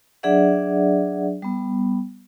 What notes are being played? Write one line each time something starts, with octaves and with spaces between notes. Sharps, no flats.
F#3 D4 G#4 D5 E5 F#5
G3 B3